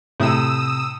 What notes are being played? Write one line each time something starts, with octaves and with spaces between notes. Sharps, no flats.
A2 C3 D#6 E6